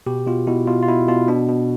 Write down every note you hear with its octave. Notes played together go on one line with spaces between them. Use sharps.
B2 G4
B2 F4
B2 E4
B2 F4
F4
B2 E4
B2 F4
B2 D4
B2